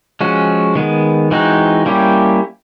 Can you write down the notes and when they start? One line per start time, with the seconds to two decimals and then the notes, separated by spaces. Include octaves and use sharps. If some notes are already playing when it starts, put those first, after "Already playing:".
0.21 F3 G#3 C#4 F#4
0.75 D#3 G#3 B3
1.31 E3 G#3 C4 D#4 F#4
1.86 G3 A#3 C#4 E4 G4